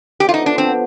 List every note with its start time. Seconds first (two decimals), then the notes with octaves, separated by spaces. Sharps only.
0.20 D3 F3 B3 G4
0.29 F4
0.34 D#4
0.46 D4
0.58 D3 F3 B3 C4